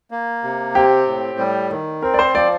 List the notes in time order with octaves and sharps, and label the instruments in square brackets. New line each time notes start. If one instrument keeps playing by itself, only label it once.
[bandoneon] A#3
C3
[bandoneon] C4 [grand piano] G4
[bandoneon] A2
G3
D#3
[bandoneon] C4 [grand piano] A#4
[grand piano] D5
C5
[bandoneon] F3 [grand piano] D5